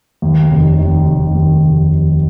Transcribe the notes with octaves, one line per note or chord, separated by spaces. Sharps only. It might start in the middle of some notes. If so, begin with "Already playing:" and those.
D#2
F1
D#3
F1
D#2
F1
D#3